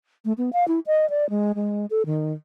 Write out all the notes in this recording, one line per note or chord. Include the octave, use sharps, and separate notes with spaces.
A3
B3
F5
E4
D#5
D5
G#3
G#3
A4
D#3